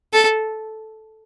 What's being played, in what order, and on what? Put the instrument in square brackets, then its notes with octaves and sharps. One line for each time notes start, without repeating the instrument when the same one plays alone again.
[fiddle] A4